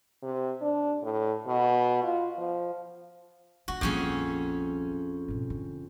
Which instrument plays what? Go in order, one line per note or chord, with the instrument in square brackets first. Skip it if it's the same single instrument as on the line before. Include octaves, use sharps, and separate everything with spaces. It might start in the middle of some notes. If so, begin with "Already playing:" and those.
[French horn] C3
D4
A2
B2
F4
F3
[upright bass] D#1 D4 [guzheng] F#4
[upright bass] A#1 G3 [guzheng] F2 C#4 G#4
[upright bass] G#2 B2
D3